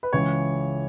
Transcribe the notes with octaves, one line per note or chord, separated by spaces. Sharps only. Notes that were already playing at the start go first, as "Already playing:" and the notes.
B4
C#2 C#3 E3 C#5